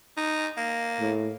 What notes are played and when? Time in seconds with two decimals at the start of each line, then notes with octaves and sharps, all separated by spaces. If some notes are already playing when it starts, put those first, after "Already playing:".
0.17 D#4
0.57 A#3
1.00 A2